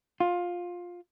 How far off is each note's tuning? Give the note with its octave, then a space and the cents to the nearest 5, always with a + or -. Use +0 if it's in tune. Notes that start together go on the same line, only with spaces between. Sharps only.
F4 +15